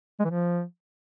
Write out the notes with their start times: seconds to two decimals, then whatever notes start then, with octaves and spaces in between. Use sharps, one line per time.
0.20 G#3
0.25 E3
0.30 F3